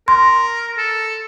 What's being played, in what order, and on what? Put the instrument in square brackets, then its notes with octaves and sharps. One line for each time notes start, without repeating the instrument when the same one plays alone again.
[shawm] A#4 [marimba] C6
[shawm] A4